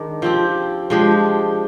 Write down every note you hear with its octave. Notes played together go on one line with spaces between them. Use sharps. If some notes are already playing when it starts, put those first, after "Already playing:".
Already playing: D#3 G#3 D4
F3 C4 G4
F3 G#3 D4 G4